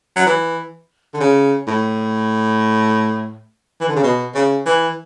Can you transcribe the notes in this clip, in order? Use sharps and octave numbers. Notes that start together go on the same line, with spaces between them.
F#3
E3
D3
C#3
A2
E3
D3
C#3
B2
C#3
E3